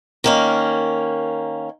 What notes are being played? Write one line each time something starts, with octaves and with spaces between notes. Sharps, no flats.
D#3 A#3 C#4